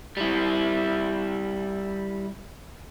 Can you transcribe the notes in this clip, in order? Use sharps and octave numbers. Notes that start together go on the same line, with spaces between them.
G3 E4